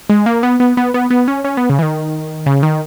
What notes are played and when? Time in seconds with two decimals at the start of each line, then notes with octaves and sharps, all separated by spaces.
0.10 G#3
0.26 A#3
0.43 B3
0.60 B3
0.77 B3
0.94 B3
1.10 B3
1.28 C#4
1.45 C#4
1.57 B3
1.69 C#3
1.79 E3
1.82 D#3
2.46 C#3
2.63 D#3